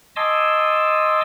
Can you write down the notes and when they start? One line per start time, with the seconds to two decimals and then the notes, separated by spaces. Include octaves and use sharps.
0.16 D#5 G#5 A5 C6 D6 E6